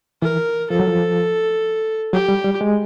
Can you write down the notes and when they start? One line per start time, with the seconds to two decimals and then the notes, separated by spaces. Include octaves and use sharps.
0.22 E3 A#4
0.70 F3 A4
0.80 F#3
0.88 F3
2.13 F#3 G4
2.28 G3
2.44 G3
2.61 G#3